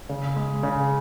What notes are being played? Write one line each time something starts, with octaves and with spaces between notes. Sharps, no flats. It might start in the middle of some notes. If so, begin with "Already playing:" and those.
C#3
G#3
C#3